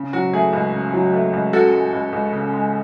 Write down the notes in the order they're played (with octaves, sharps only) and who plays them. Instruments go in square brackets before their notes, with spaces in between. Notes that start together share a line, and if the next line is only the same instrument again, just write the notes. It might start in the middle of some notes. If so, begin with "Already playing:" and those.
Already playing: [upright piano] C#3
F#3 F#4
A3 G#4
C#2
C#3
F#3
A3
C#2
C#3 F#4 A4
G#3
C#2
C#2
C#3
G#3